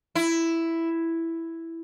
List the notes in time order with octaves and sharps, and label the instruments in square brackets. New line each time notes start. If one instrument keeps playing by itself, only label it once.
[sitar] E4